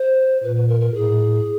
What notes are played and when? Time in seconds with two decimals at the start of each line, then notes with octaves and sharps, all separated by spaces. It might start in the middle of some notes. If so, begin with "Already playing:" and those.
Already playing: C5
0.43 A#2 B4
0.56 B4
0.68 A#4
0.81 A#4
0.94 A2 G#4